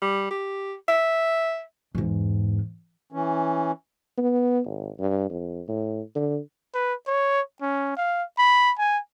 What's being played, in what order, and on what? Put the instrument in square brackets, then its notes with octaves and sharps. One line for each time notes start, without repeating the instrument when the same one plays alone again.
[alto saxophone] G3
G4
E5
[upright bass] E2 G#2
[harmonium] E3 C#4
[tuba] B3
G#1
G2
F2
A2
D3
[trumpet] B4
C#5
C#4
F5
B5
G#5